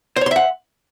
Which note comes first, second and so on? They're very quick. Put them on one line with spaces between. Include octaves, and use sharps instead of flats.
C5 C#5 C6 E5 F#5